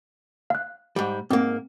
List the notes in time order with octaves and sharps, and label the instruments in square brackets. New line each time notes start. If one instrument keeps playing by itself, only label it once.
[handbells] F5 F#6
[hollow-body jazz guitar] G#2 G3
[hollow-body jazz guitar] G#2 A#3 [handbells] C4